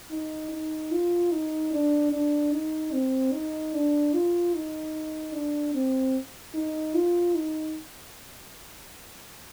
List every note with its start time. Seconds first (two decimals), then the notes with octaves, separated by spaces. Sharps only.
0.11 D#4
0.52 D#4
0.93 F4
1.32 D#4
1.73 D4
2.12 D4
2.53 D#4
2.93 C4
3.33 D#4
3.73 D4
4.14 F4
4.54 D#4
5.34 D4
5.75 C4
6.54 D#4
6.95 F4
7.35 D#4